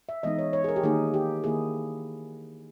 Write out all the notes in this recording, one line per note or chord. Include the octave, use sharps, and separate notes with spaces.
E5
E3 G#3 B3 D#4 D#5
C#5
C#5
G#4
A#4
G4
D#3 A#3 D#4 G#4
G4
D#3 A#3 E4 G#4